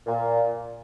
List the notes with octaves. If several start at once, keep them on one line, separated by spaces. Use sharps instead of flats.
A#2